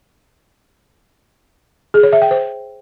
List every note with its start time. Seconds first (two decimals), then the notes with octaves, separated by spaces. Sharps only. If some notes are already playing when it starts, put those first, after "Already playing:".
1.94 G#4
2.03 C#5
2.13 E5
2.22 G5
2.31 C5